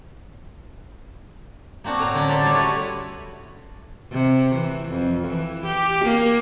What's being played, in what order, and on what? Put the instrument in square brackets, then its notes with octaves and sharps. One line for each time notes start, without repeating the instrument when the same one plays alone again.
[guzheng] A#3 C4 D4 F#4 C5
A2 A#5
D3 F#3 C#4 D4
A4 C5 E5
G3 A3 E4 C#5
D4 E4 F#4 B4
[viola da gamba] C3
E3
F2
E3
G4
A#3